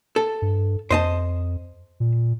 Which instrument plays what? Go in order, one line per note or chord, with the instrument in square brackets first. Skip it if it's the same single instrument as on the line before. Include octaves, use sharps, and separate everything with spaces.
[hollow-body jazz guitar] A4
[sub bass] G2
[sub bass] F2 [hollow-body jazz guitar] C5 D#5 A5
[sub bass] A#2